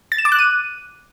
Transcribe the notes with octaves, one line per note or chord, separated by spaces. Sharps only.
A6
E7
D6
F#6
D#7